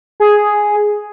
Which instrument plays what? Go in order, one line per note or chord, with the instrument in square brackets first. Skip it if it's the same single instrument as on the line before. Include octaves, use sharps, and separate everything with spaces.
[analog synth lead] G#4